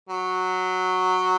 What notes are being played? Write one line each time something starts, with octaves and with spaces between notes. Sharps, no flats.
F#3